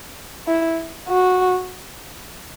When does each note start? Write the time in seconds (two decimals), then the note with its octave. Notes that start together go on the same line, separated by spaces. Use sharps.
0.48 E4
1.09 F#4